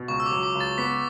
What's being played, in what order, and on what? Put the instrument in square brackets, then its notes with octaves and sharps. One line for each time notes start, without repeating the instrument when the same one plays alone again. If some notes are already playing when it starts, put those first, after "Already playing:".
Already playing: [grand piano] B2
[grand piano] C#2 [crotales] C#6
[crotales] E6
D6
[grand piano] F#3
[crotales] D6
[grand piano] C#2
[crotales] A6
[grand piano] B3 [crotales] B6